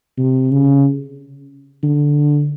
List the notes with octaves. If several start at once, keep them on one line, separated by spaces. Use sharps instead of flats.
C3
C#3
D3